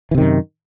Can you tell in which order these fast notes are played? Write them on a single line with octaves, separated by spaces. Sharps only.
E3 C3 D#3 F#2